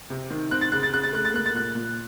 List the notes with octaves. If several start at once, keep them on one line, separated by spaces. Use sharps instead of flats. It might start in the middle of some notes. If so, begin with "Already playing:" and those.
C3
D#3
C4 F#6
A6
C#3 F#6
A6
C#3 F#6
A6
A3 F#6
A6
A#3 F#6
A6
A#2 F#6
A#2